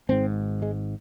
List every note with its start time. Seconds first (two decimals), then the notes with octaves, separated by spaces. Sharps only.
0.09 G#1 G#2 C4
0.62 G#3